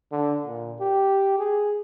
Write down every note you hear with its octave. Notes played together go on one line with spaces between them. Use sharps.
D3
A#2
G4
G#4